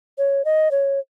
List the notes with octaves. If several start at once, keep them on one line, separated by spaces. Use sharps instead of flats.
C#5
D#5
C#5